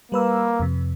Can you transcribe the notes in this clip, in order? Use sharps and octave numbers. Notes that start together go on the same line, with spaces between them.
G3 A#3 B4 E6
F2 C3